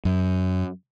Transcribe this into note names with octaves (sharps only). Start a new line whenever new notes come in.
F#2